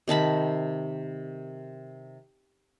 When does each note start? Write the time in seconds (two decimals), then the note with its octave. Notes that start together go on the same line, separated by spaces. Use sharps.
0.08 C3 D#3 A5 B5